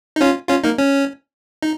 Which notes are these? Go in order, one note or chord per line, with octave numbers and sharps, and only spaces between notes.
D#4
C#4 F4
C#4 F4
A#3 D#4
C#4
D#4